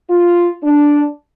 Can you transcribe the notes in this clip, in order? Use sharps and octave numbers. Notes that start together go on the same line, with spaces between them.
F4
D4